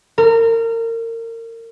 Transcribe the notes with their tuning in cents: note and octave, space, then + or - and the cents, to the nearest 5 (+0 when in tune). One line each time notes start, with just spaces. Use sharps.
A#4 -30